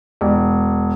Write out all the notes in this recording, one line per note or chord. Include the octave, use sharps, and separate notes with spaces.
E1